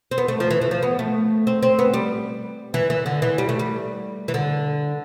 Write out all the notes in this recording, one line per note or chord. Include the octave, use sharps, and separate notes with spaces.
C4
B3
A3
F3
E3
E3
F3
B3
A3
C4
C4
B3
G3
E3
E3
D3
E3
G3
A3
G3
E3
D3